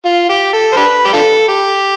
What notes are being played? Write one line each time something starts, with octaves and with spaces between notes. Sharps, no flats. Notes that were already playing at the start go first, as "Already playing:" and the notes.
F4
G4
A4
C5
D4 G4 B4
G4
D4 F4 A4
G4